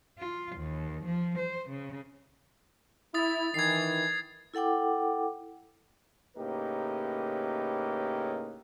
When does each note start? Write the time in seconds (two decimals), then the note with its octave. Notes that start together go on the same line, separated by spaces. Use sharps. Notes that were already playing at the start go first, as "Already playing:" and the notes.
0.18 F4
0.56 D#2
1.05 F3
1.38 C5
1.70 C#3
3.14 E4 D#6 A6
3.54 D#3 E3 G#6 C7
4.54 E4 A4 F#5 G5 D6
6.36 A2 C#3 A#3 D#4 G4 B4